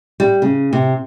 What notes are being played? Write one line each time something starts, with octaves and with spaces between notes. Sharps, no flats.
G3
C#3
C3